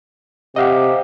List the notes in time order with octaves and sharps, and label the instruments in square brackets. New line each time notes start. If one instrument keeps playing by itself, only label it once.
[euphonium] C3 [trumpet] G4 [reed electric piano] D#5 F5 F#5